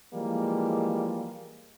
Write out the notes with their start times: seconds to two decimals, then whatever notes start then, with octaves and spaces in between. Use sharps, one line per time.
0.14 E3 F3 G3 G#3 A#3